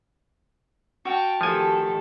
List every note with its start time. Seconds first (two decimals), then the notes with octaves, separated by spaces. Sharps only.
1.05 F#4 F5 G5 A5
1.41 D#3 F3 A3 G4 A4 G#5